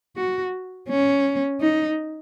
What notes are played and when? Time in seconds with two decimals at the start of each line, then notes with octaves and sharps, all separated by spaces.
0.17 F#4
0.89 C#4
1.61 D#4